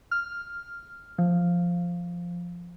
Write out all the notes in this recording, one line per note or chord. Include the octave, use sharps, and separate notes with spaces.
F6
F3